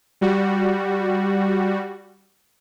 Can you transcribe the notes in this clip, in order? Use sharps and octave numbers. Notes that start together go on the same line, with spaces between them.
G3 F#4